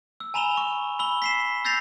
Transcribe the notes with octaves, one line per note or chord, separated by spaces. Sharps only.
E6
G#5 A#5 B5 E7 F7 G7
C#6
B5 E6 G7
B6 C7 E7
E6 G6 A6 A#6 C7 F7